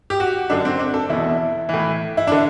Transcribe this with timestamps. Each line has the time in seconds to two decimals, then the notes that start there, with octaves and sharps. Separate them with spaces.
0.10 G4
0.20 F#4
0.50 F#2 D3 D4
0.65 C4
0.79 D4
0.94 A4
1.09 E2 B2 E4
1.69 A2 E3
2.17 E4
2.27 D3 D4